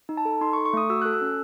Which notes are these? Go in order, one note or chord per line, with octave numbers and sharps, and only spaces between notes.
D#4
A5
A4
D#4 C6
C#6
A4
C#6
A3 D#6
F#4 E6
A4 F#6
E6
C#4